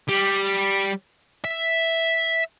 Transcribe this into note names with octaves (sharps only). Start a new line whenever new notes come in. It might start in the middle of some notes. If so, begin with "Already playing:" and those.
G3
E5